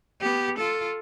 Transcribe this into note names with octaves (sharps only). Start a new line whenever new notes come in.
B3 G4
F4 A4